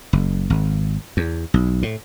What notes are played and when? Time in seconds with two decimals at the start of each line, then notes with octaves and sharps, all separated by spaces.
0.13 F#1
0.50 G#1
1.17 E2
1.54 B1
1.83 A2